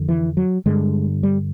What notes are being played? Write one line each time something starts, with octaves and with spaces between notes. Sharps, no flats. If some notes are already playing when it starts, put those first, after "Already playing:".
Already playing: F2 D3
E3
F#3
G2 D3 G#3
G3